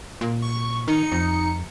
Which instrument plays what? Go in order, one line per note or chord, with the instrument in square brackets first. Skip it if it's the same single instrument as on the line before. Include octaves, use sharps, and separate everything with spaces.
[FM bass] A#2
[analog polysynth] C#6
[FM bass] D#3 [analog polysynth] D#4 C#7
[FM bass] F2